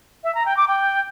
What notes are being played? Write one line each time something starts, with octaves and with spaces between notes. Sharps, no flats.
E5
A#5
G5
D6
G5